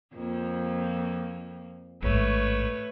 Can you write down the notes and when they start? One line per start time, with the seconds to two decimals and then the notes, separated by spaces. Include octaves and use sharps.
0.14 F2 F3 A#3
2.03 A1 G#2 A3 B4 C#5